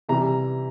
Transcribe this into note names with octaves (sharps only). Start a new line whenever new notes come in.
C3 E3 G3 A#5